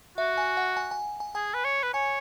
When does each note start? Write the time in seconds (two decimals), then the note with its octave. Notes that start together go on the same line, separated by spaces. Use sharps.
0.18 F#4 E5
0.38 G#5
0.57 F#5
0.77 G#5
0.91 G#5
1.20 G#5
1.35 G#4 G#5
1.54 B4
1.65 C#5
1.83 B4
1.94 C#5 G#5